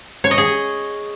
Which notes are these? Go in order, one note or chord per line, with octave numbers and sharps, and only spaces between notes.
C#5
D#5
G#4